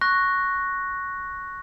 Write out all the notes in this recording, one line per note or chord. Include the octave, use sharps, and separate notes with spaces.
C#6 F#6 A#6